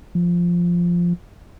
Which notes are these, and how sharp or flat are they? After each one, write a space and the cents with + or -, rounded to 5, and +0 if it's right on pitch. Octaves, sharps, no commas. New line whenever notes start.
F3 -5